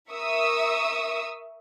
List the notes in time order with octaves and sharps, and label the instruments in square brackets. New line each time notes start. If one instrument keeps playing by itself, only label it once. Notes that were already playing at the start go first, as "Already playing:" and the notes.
[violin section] A#4 E5 C#6 D#6 E6